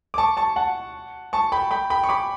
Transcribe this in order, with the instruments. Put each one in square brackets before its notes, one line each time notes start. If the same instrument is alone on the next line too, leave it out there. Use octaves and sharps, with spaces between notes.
[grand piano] D6
A5 C#6
A5 C#6
F#5 A5
A5 C#6
G5 B5
G5 B5
G5 B5
C#6
B5 D6